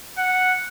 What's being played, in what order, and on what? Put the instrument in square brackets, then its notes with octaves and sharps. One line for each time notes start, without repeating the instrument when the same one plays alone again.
[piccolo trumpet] F#5